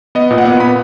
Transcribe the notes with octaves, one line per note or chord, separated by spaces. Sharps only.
B3 D#5
A#2
F#5
B3
B3 B5